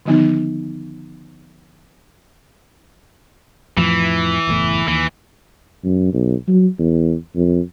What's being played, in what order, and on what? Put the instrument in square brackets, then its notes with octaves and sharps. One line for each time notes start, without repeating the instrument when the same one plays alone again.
[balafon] D3 D#3 F3 B3 D#4
[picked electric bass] F2 A2 F3 [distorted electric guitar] E3
[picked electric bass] F#1 E2 A2
[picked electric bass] D#2 [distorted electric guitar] E3
[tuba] F#2
B1
F#3
E2
F2